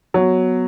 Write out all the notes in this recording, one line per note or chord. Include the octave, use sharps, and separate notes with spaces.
F#3 B3